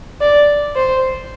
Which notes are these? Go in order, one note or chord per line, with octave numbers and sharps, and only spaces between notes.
D5
C5